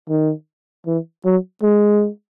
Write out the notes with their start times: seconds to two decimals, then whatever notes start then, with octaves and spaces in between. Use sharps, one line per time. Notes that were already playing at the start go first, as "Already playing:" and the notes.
0.09 D#3
0.86 E3
1.25 F#3
1.63 G#3